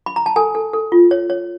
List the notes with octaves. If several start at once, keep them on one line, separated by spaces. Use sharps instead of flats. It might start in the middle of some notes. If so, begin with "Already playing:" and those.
B5
A#5
A5
A4 G#5
A4
A4
F4
C#5
C#5